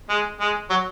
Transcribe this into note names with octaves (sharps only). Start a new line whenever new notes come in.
G#3
G#3
F#3